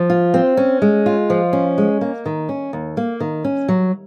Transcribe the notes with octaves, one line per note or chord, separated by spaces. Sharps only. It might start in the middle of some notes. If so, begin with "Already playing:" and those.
Already playing: F3
F4
C4
C#4
G#3
F4
F3
C#4
G#3
A#3
D#3
C#4
D#2
A#3
D#3
C#4
F#3